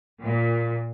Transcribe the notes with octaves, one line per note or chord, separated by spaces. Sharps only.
A#2